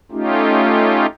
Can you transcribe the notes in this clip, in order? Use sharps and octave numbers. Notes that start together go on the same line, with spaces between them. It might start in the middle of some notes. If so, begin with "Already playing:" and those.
A3 C#4 D#4 F4 G4